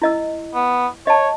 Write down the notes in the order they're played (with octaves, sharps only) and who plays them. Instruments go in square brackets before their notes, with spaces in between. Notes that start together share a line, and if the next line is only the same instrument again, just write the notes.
[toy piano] E4 D#5 E6
[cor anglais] B3
[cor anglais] C#5 [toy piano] D#5 A5